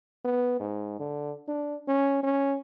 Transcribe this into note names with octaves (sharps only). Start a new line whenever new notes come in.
B3
G#2
D3
D4
C#4
C#4